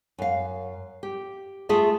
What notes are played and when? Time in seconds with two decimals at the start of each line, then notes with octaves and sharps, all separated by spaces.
0.18 F#2 F5
1.03 G4
1.69 A3 F4 G#4 E5 A5